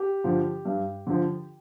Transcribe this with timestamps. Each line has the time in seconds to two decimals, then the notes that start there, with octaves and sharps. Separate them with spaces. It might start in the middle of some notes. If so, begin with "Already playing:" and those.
Already playing: G4
0.24 D3 F3
0.65 G2
1.07 D3 F3